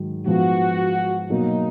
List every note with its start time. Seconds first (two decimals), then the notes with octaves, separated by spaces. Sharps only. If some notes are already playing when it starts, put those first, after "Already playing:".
Already playing: G#2 D#3 F#3
0.26 G#2 F3 B3 F#4
1.30 B2 F#3 A#3 D#4